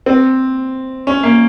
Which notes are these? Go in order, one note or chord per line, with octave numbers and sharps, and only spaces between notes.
C4
C#4
A#3